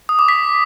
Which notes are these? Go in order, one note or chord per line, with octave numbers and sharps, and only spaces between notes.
D#6
D6
B6